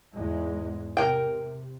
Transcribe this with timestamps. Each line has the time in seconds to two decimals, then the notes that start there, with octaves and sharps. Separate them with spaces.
0.13 E2 G#2 G#3
0.97 C3 A#4 G5